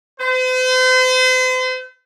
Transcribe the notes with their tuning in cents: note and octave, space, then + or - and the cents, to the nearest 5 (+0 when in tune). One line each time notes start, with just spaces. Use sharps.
C5 -40